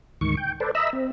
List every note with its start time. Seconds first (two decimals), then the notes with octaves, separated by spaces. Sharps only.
0.21 D2 G#2 D#3 C#6
0.37 G5
0.60 A4 B4 C5 D5
0.75 D#5 E5 A#5 B5 E6
0.93 C4